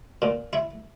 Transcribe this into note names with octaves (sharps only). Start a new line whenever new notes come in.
A#2
E4